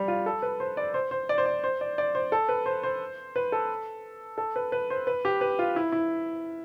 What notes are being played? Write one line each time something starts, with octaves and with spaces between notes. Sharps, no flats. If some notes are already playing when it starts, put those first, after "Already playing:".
Already playing: G3
F4
A4
B4
C5
D5
C5
C5
D5
C5
D5
C5
D5
D5
C5
A4
B4
C5
C5
B4
A4
A4
B4
B4
C5
B4
G4
B4
F4
E4
E4